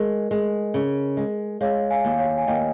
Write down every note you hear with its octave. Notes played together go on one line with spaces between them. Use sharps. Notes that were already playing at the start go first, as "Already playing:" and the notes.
Already playing: G#3 A#4
G#3
C#3
G#3
G#3 C#5 F5
F5 G#5
D#2
C#5 F5
G#5
D#2 D#5 G5